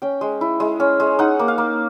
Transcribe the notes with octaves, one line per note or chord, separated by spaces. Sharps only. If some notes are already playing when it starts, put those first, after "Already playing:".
C#4 G5
G#3
E4
G#3
C#4
G#3
D#4 F#5
A#3
F5
A#3